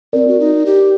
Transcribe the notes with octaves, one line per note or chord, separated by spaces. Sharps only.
C4 A#4 D5
F#4
D#4
G4